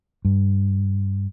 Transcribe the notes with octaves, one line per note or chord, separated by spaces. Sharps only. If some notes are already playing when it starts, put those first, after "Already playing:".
G2